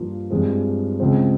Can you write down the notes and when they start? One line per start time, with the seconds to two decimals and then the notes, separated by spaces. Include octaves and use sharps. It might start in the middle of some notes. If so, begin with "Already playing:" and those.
Already playing: G2 F3 A#3 F4
0.30 G2 F3 G#3 C4
1.00 C#2 C#3 F3 C4